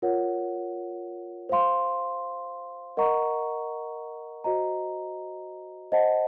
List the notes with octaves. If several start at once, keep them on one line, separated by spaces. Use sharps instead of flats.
F4 A#4 C#5 F#5
C5 F5 C6
A#4 D#5 F#5 A#5 C#6
F#4 C5 D#5 A#5
C5 D#5 F#5 A5